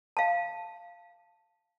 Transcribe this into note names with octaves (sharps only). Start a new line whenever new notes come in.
F5 A5